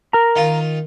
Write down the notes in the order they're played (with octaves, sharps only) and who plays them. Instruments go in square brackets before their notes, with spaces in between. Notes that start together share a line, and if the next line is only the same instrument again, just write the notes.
[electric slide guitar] A#4 A#5
[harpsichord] D#3 F4